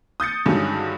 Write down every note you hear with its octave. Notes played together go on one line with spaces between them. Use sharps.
D#6 G6 A6 C#7
G2 D3 D#3 F#3 G#3 C#4